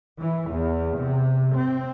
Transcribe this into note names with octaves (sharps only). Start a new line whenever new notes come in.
E3
E2
C3
C4